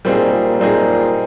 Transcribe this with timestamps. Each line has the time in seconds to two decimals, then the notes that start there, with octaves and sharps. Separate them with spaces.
0.05 A#2 G3 C4 D#4 G#4
0.32 A#2
0.60 A#2 G3 C4 D#4 G#4